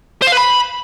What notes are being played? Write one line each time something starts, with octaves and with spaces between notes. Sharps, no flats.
C5
F5
B4
B5